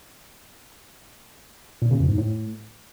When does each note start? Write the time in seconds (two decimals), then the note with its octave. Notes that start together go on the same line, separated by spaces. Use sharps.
1.82 A#2
1.91 C#3
2.00 F2
2.09 G#2
2.18 A2